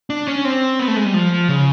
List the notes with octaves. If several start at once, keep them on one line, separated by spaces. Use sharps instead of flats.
D4
C#4
C4
B3
A3
G#3
G3
F3
C#3